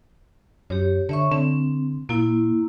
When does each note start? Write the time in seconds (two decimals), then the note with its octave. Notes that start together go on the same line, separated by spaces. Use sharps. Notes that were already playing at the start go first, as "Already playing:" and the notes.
0.70 F#2 G4 C#5
1.09 D3 C#5 E5 C#6
1.31 D3 C4
2.09 A#2 A#3 E4